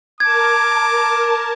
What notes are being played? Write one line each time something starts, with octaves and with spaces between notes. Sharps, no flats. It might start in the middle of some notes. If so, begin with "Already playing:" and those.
A#4 A5 D6 G#6